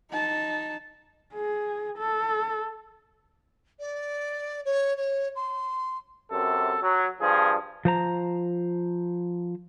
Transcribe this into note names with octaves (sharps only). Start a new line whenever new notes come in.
D#4 A5
G#4
A4
D5
C#5
C#5
C6
F#2 C3 A4
F#3
G2 F3 G#4
F3 C5 A#5